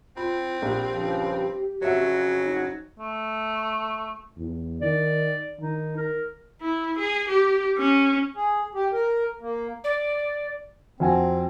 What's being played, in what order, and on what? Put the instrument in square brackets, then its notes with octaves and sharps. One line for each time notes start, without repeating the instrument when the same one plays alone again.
[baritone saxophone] C4 [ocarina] F4 [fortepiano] B5
[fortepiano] A#1 [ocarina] G4
[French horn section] G2 C#3 F3
[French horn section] F2 C#3 F#4 [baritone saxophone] F#3 [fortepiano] C#5 E5
[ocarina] D#4
[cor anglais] A3
[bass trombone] E2
[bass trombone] D#3 [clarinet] D5
[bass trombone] D#3 [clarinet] D#4
[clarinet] A#4
[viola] E4
G#4
G4
C#4
[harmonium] G#4
G4
A#4
A#3
[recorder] D5
[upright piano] F2 F#4 G#5 [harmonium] C4